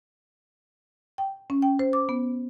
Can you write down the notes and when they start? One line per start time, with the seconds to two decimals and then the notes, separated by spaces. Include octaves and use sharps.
1.18 G5
1.50 C#4
1.62 G5
1.79 C5
1.93 D6
2.09 B3